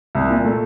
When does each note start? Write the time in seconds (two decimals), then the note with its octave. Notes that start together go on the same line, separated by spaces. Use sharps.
0.15 C2
0.30 A#2
0.45 A3